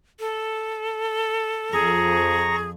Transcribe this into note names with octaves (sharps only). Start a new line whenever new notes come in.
A4
F2 G#4 A#5 C#6 A#6